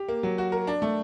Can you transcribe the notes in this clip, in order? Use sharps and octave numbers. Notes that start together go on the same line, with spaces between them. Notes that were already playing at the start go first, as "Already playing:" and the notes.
Already playing: G4
A#3
F#3
F#4
A#4
D4
A3